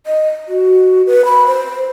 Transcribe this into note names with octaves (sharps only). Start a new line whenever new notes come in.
D#5
F#4
B4
B5
C5